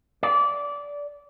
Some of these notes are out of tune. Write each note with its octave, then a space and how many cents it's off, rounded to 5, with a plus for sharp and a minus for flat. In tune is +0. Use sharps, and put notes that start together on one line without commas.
D5 -20